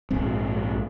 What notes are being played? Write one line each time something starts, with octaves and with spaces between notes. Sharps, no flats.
A#1 G#2 C4